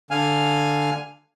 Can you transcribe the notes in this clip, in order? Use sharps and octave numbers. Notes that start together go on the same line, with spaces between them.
D3 F5 G#5 F6